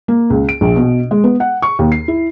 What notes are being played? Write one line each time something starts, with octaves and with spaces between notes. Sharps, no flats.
A#3
C#2
D7
A#1
B2
G#3
B3
F#5
C#6
D#2
C7
E4